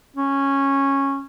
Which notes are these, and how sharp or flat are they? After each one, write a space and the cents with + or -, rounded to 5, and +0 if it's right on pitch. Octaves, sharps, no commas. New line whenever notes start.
C#4 -10